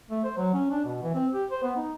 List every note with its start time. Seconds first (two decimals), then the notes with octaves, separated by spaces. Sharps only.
0.10 A3
0.24 C5
0.38 F#3
0.54 C#4
0.71 D4
0.85 B2
1.03 E3
1.14 C4
1.33 G4
1.51 C5
1.63 B3
1.76 D#4